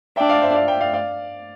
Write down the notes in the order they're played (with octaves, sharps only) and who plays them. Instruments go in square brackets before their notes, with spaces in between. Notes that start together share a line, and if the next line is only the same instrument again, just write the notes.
[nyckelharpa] D4 [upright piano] E5 G5
[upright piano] D5 F5
C5 E5
D5 F5
E5 G5
D5 F5
D5 F5